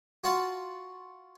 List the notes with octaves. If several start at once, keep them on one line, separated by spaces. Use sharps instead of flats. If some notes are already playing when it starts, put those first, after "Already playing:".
F4 F#4 F5 F#5 A5